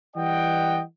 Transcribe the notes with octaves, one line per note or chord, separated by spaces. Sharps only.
E3 G3 D#5 F#5 G5